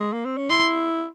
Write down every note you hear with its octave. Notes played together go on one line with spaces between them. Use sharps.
G#3
A#3
C4
C#4
E4 C6